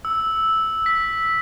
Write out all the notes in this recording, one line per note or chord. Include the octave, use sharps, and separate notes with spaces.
E6
B6